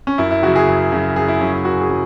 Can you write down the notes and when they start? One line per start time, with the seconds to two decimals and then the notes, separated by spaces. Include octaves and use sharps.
0.07 C#4
0.18 F#2 E4
0.31 E4
0.42 C#3 F#3 F#4
0.56 G#4
0.67 F#2
0.92 C#3 F#3
1.16 F#2 G#4
1.28 E4
1.41 C#3 F#3 C#4
1.53 E4
1.65 F#2 F#4
1.81 G#4
1.90 C#3 F#3